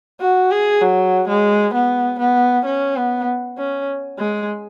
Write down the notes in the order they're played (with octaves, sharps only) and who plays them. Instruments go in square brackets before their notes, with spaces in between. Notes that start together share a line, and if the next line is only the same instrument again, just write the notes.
[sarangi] F#4
G#4
F#3
G#3
B3
B3
C#4
B3
C#4
G#3